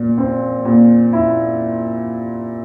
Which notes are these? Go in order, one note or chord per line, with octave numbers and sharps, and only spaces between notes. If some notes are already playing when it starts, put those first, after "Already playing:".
Already playing: A#2
C4
A#2
E4